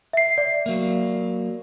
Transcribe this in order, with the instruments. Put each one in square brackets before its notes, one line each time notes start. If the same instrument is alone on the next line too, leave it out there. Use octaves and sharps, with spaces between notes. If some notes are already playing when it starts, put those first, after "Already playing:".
[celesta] E5 C7
D5
[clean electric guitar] F#3 A#3